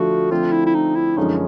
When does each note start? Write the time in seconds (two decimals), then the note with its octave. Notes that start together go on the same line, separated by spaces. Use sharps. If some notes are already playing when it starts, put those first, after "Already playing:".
Already playing: D3 F3 A3 F#4
0.30 D3 F3 A3 C4 F4
0.52 E4
0.66 E4
0.75 D#4
0.95 E4
1.17 F#2 D3 F3 G#3 C#4 D#4